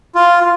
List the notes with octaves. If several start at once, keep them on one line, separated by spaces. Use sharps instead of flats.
F4